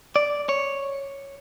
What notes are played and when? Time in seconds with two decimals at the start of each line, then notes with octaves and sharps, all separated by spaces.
0.16 D5
0.49 C#5